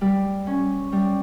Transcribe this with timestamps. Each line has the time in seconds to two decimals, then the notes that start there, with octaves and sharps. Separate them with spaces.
0.01 G3
0.47 C#4
0.92 G3